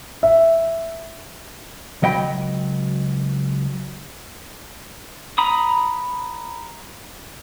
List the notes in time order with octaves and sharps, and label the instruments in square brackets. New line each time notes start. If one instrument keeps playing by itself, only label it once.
[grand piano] E5
[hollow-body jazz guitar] C#2 F#3 D#5 G5 B5
[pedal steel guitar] A#5 B5 D#6